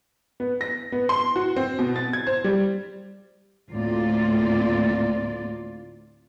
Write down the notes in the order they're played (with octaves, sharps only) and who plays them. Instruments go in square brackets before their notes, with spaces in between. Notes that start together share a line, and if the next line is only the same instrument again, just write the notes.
[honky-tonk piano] B3
A#6
B3
C6
F#4
C4
B2
A6
G#6
C5
G3
[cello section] D2 A2 A#3 C4 F4 D5